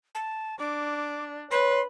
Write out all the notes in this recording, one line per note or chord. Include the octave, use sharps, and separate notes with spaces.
A5
D4 D6
B4 C#5 C6